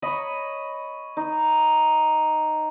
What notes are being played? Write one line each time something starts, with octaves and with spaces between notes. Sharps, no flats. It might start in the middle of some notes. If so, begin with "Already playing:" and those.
C#5 D#5 B5
D#4